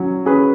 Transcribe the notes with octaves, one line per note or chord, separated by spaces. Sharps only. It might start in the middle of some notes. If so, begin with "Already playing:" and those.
Already playing: F#3 C#4
C#4 G#4 B4